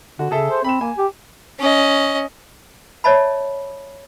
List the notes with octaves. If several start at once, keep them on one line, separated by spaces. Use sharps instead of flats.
D3 F#4
C#3 G#4 A4 E5
C5
C4 B5 E7
A#3 G#5
G4
C#4 D#5
C#5 D5 E5 A5 B5